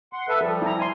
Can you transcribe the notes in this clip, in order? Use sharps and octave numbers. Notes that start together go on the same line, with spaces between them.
F#5 C6
A4 B4 E5
F3 G3 A4
E4 A#5
G#5 C6